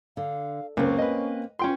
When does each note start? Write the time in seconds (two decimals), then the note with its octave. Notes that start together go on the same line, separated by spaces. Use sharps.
0.17 D3 F5
0.77 C#2 F#2 A#3 C4 C#4
0.99 B4 D#5
1.59 C#4 F4 G5 C6